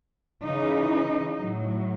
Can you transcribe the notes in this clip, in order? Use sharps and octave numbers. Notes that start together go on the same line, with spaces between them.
C#3 E3 D#4
A2 F#3